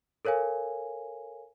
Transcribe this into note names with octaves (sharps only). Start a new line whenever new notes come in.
A4 A#4 C#5 F5 G#5